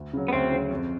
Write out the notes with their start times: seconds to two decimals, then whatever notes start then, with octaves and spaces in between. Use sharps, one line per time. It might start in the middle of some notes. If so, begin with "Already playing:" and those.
Already playing: D2
0.13 C#3 F#3
0.28 B3
0.33 D2 C4
0.52 C#3 F#3
0.71 F2